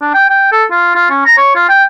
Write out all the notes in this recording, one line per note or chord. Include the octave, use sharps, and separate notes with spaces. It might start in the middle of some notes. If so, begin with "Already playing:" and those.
D4
G5
G5
A4
F4
F4
C#4
A#5
C#5
F4
G5